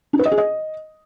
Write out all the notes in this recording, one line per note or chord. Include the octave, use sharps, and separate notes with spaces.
D#4
B4
D#5
G#4
D#5